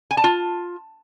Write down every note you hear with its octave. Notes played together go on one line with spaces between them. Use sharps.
G#5
A5
F4